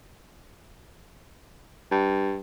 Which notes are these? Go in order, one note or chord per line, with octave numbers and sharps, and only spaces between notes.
G2